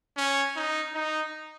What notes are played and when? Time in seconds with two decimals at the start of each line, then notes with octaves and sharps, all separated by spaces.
0.17 C#4
0.56 D#4
0.94 D#4